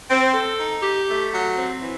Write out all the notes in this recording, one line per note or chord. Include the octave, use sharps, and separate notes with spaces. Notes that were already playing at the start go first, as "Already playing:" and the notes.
C4
A4
D#4
G4
A3
F#3
C4
E3